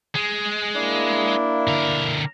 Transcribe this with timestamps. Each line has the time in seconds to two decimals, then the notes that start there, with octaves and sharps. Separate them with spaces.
0.15 G#3
0.75 A#3 D4 E4
1.68 D3 A#4